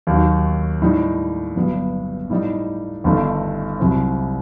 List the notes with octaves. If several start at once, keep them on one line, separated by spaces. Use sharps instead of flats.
D#2 D#3 F#3
A2 G3 D#4
G1 G2 F#3 B3
A2 G3 D#4
G1 G2 D#3 A3 D#4
C2 C3 F#3 C4 E4